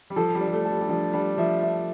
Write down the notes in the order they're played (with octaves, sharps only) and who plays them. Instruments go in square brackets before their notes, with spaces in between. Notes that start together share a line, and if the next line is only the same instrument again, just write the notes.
[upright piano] G3
[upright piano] F3 [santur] A4
[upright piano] G3
[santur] D4
[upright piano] G3
A3
[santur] A4
[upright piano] G3
G3
[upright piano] F3 [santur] D4
[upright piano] G3 [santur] D4
[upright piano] F3 [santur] E5
[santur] E5